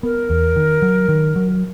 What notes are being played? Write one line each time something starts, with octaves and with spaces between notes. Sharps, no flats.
B3 A#4
E2
D#3
F#3
D#3
F#3